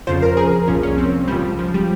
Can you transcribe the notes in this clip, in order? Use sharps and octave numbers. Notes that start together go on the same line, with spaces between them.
F2 C#3 F3 C5
A#4
G#4
C2 A#2 F3 C#4
C#4
C4
C#2 C#3 F3 G3
F3
G3